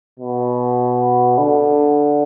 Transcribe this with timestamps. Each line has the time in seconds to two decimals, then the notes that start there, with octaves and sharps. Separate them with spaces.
0.20 B2
1.38 D3